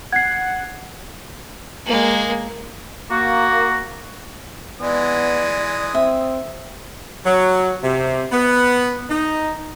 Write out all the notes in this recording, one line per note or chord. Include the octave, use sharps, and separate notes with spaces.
F#5 G#6 C7
G#3 A#3
A#3 F#4
E3 G#3 B3 D5 D#6
C4 E5
F#3
C3
B3
D#4